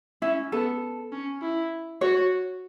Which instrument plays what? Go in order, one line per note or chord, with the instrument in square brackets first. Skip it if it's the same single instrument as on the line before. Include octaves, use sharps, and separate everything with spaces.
[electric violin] C#4 [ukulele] E4
[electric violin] B3 [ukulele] A4
[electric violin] C#4
E4
[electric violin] F#4 [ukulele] C#5